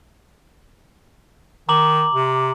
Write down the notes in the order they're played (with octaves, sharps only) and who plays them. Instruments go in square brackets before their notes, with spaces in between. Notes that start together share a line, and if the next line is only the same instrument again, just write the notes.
[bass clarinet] D#3 [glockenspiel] A#5 D6 F#7
[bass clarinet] C3